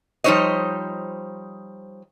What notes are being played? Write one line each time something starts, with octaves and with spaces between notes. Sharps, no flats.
F3 G3 D#4 C5 C#5 D#5